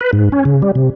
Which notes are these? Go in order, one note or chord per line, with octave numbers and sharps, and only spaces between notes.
B4
G#2
C#4
C#3
G3
C3